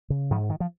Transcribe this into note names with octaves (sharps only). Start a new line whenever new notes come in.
C#3
G#2 F3
D#3
F3